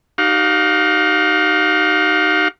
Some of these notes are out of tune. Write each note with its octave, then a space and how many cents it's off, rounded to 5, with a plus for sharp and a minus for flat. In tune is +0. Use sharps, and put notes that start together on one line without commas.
D#4 -10 G4 -40 F5 +25